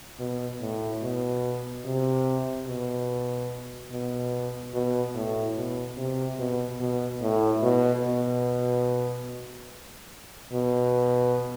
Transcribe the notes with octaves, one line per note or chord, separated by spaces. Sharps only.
B2
A2
B2
C3
B2
B2
B2
A2
B2
C3
B2
B2
A2
B2
B2
B2